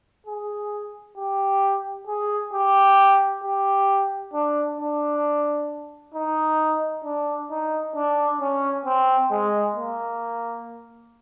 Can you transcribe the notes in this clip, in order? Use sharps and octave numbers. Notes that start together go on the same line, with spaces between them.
G#4
G4
G#4
G4
G4
D4
D4
D#4
D4
D#4
D4
C#4
C4
G#3
A#3